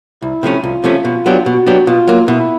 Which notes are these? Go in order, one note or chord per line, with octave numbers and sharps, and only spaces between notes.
C2 E4
C3 F3 A3 C#4
C2 F4
C3 F3 A3 C#4
B2
F#3 B3 D4 G4
B2 F#4
F#3 B3 D4 G4
B2 F4
F#3 A#3
B2 E4